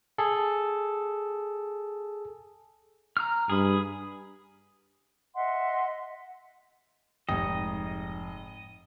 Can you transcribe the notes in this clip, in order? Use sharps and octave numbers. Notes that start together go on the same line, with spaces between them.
G#4 A4
A#5 F6
G2 G#4 B5
D#5 E5 F#5 C6
F1 G#2 D#5 G5